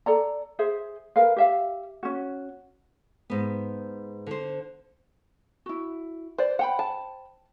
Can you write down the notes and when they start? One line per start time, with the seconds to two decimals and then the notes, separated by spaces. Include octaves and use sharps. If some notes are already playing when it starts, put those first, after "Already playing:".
0.06 A4 D5 A#5
0.59 G#4 C5 E5
1.16 A#4 B4 F5
1.36 G4 E5 F5
2.03 C#4 F#4
3.30 G#2 B3
4.27 D3 C5
5.66 E4 F#4
6.38 B4 C5 D5
6.59 C5 F#5 G5 B5
6.79 A5